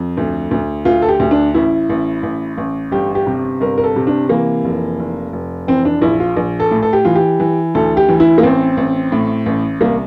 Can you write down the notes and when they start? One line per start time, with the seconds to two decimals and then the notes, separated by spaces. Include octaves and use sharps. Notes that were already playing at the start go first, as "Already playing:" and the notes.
Already playing: F2
0.17 D2
0.51 D2
0.85 D2 F4
1.02 A4
1.08 G4
1.20 D2
1.31 D4
1.54 A1 E4
1.89 A1
2.23 A1
2.58 A1
2.92 G1 G4
3.15 G4
3.26 C3
3.60 G1 A#4
3.78 A#4
3.84 A4
3.96 C3
4.07 D4
4.29 E3 A#3
4.64 F1
4.99 F1
5.33 F1
5.67 E3 C4
5.85 D4
6.02 A#1 E4
6.20 F4
6.37 A#1
6.60 A4
6.71 A2
6.83 A4
6.93 G4
7.05 E3 F4
7.15 G4
7.40 E3
7.75 D2 A4
7.97 G4
8.08 E3
8.20 E4
8.38 A#3
8.43 A1 C4
8.77 A1
9.12 A2
9.46 A1
9.81 C2 A#3